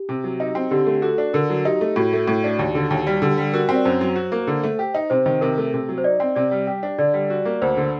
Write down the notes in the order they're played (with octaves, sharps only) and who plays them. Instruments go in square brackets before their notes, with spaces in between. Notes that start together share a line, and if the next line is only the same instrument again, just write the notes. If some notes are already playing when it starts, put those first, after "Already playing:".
Already playing: [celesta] G4
[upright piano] C3
F#3
D#4
C4
[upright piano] D3 [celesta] G4
[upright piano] A3
[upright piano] F#4 [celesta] A4
[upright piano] D4
[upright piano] D3 [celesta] A#4
[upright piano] F#3
[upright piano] D#4 [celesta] G4
[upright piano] A3
[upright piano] A2 [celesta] F#4
[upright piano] A3
A2
D4
D#2
D3
D#2
G3
[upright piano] D3 [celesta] G4
[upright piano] G3
[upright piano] F#4 [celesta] A#4
[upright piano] C4
[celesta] D5
[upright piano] F#2 [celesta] C5
[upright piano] F#3
F#4
A#3
D3
A3
G4
D#4
[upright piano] C3 [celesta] C5
[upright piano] D#3
[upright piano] C3 [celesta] A#4
[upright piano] A3
C3
F#3
[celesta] C5
[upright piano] D#4 [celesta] D5
[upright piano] C4
[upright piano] C3 [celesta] D5
[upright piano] G3
G4
D4
[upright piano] D3 [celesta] D5
[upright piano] G3
F#4
A#3
[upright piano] D2 [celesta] C5
[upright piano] D3